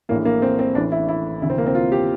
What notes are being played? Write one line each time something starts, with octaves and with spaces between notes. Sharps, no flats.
A#1 A2 E3 A#3
A#3
C4
C4
A1 A2 E3 D4
E4
E4
D2 C3 E3 E4
C4
A#3
C4
F4
G4